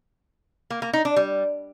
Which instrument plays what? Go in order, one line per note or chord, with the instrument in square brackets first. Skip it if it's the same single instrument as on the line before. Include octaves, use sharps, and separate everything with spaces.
[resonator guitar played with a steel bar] A#3
A#3
D#4
D4
G3